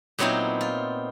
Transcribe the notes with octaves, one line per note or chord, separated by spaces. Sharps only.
A#2 F#3 B3 C4 D#4 E4
F4